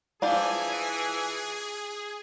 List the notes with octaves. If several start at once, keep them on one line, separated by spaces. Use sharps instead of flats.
E3 D4 F4 G#4 C5 G#5